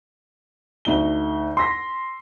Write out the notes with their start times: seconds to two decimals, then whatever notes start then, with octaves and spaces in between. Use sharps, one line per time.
0.85 D2 D#4 G7
1.57 C6 E6 A#6 B6